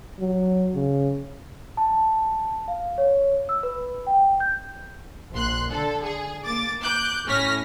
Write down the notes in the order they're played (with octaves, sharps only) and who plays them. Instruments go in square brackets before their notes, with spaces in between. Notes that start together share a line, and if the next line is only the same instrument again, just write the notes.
[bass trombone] F#3
C#3
[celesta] A5
F5
C#5
E6
B4
G5
G6
[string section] A#1 C6 F#6
D3 A4
G#4
A#3 D6 A6
D6 F#6 G6
A2 C#4 F6 A#6 B6